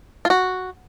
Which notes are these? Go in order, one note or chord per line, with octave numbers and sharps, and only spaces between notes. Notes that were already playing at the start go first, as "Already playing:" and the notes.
F4
F#4